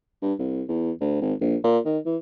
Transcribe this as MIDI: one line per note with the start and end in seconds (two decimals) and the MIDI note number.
0.22 0.34 43
0.39 0.62 36
0.68 0.91 40
1.01 1.18 38
1.22 1.34 32
1.41 1.56 34
1.64 1.79 46
1.86 1.98 51
2.06 2.17 52